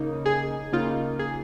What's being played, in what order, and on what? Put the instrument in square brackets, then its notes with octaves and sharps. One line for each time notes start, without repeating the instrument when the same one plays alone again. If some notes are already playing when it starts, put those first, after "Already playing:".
Already playing: [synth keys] C#3 A#3 D#4
G#4
C#3 A#3 D#4 F4
G#4